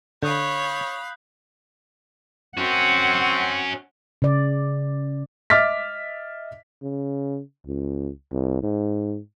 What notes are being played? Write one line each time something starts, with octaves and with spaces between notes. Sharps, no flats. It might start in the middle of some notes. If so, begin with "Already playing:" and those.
D3 C#5 F5 B5 D#6 F#6 G6
C4 C#4 F#4 F#5
C#3 D5
D#5 E5 D6 F6 A6 B6
C#3
C#2
C2
G#2